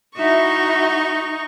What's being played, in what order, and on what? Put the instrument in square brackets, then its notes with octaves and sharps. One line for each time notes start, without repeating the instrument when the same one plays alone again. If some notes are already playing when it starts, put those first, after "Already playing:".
[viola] D#4 C#6 [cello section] E4 F#4 E5